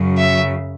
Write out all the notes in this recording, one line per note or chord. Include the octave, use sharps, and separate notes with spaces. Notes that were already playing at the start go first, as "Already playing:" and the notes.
Already playing: F#2 C#3 F#3
E5